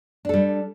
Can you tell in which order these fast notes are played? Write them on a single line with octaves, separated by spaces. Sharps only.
D4 A4 G3